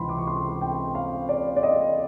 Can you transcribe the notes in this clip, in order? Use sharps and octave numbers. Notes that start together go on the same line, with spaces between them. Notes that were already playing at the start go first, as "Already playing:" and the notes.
Already playing: C#2 C3 E3 B5 C6
D6
C#6
C6
G5
F5
D5
D5
D#5